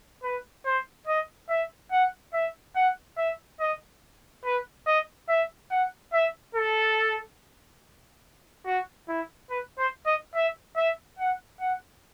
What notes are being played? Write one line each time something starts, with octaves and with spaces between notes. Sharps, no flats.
B4
C5
D#5
E5
F#5
E5
F#5
E5
D#5
B4
D#5
E5
F#5
E5
A4
F#4
E4
B4
C5
D#5
E5
E5
F#5
F#5